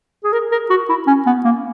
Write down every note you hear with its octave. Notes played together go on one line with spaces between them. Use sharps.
G#4
A#4
A#4
F#4
E4
C#4
B3
A#3